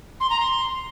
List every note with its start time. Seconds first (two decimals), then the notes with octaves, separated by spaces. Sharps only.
0.20 C6
0.30 A#5
0.40 C6